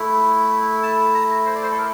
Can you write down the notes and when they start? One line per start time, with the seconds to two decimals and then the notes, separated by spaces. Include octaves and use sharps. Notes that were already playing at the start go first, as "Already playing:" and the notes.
Already playing: A3 E4
0.83 A5
1.14 A#5
1.46 C5
1.55 D5
1.63 C5
1.71 A4
1.78 A#4